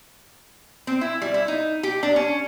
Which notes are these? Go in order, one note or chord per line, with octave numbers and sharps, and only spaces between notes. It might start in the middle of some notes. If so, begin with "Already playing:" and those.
C4
E4
G3
E4
D#4
G4
D4
C#4